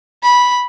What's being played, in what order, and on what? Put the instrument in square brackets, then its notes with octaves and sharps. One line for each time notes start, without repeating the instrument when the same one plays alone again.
[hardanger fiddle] B5